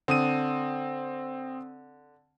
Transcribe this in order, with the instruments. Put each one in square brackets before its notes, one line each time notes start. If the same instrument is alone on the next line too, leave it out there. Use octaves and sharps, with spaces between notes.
[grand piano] D3 [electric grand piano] C4 D#6 D#7